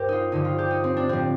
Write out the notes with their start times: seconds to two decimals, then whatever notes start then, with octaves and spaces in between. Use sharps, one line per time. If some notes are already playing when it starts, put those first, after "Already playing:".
Already playing: G2 G4 A#4 C5
0.09 D#4 F4
0.32 G2 D3 F3 D#4
0.45 F4
0.58 G4
0.71 D#4
0.84 C4
0.97 D4
1.09 A2 F3 C4